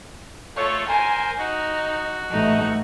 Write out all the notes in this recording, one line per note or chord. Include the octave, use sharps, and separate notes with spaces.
A3 F4 C#5
A#4 C5 G#5
D#4 F#4
A1 A3 D#4